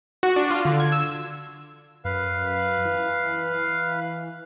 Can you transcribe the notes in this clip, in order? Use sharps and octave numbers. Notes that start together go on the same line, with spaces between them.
F#4
D4
F4
D3
G#6
E6
F#2 B4 F5
E3